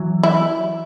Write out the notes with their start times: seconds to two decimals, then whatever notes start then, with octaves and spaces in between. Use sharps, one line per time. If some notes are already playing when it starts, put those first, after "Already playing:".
Already playing: E3 F#3
0.23 E4